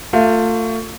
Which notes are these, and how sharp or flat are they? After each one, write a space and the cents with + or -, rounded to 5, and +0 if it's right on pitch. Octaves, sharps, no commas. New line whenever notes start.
A3 +30 F4 +15